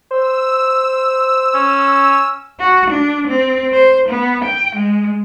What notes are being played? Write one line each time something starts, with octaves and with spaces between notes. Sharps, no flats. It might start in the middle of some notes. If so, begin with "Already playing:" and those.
C5 E6
C#4
F#4
D4
C4
C5
B3
G5
G#3